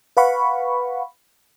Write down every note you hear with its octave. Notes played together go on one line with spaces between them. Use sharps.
B4 F5 F#5 B5 C#6